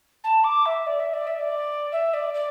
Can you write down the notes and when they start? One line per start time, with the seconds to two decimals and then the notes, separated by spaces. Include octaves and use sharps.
0.24 A5
0.44 D6
0.66 E5
0.86 D5
1.00 E5
1.14 D5
1.27 E5
1.39 D5
1.92 E5
2.14 D5
2.34 D5